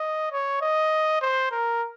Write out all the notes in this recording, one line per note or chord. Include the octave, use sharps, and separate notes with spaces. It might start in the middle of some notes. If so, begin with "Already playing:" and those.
Already playing: D#5
C#5
D#5
C5
A#4